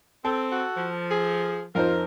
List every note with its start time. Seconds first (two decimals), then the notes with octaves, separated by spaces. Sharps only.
0.25 C4 A4
0.51 F#4
0.76 F3
1.11 G#4
1.75 F2 D#4 F4 A#4 C5